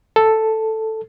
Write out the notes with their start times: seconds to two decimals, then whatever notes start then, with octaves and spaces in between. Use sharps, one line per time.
0.16 A4